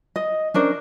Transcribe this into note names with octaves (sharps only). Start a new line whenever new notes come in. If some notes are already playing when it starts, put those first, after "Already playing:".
D#5
C#4 D4 A#4 C5